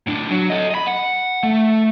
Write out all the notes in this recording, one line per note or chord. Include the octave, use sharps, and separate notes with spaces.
A2 D4
F#3
A4 D#5
D#5 B5
F#5
A3